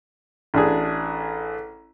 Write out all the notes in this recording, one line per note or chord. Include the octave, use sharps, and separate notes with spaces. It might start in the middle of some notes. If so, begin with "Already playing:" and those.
A1 D4 G#4